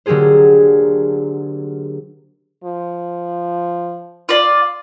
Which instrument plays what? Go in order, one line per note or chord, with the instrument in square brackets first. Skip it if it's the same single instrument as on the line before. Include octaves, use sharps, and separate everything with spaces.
[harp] D3 F#3 A#3 G4 G#4 C5
[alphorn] F3
[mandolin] F4 D5